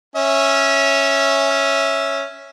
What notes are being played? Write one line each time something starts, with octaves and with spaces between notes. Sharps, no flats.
C#4 E5